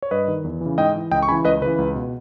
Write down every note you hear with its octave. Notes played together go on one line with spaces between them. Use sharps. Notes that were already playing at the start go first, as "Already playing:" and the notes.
C#5
G2 B4 D#5
D#3
E2
C#3 E3
G#2 D#5 G5
E3
C#2 D#5 G5
C#6
C#3 E3 G#5 B5
C#2 B4 D#5
C#3 E3 B4
C#2
B2